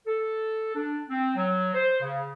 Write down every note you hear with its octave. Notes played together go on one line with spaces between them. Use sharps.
A4
D4
C4
F#3
C5
C#3